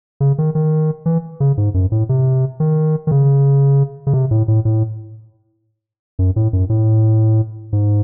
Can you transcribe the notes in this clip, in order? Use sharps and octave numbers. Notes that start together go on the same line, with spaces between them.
C#3
D#3
D#3
E3
C#3
G#2
F#2
A2
C3
D#3
D#3
C#3
C#3
C3
A2
A2
A2
F#2
A2
F#2
A2
G#2